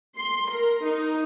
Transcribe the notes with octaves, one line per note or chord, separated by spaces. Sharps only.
C6
A#4
D#4